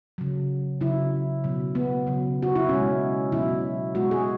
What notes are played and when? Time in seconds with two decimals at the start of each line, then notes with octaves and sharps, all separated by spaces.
0.18 C#3 F#3
0.81 C#3 F#3 E4
1.44 B2 F#3
1.75 B3
2.07 C#3 F#3
2.42 F#4
2.56 E4
2.69 B2 G#3 C#4
3.32 B2 F#3 E4
3.95 B2 G#3 F#4
4.11 G#4